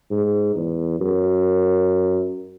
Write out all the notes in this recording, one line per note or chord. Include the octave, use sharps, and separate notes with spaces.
G#2
E2
F#2